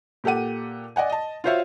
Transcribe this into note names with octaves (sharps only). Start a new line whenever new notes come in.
A#2 G4 A4 F#5 D#7
D5 D#5 F#5 G#5
D#5 A5
F4 F#4 C5 C#5 E5 F5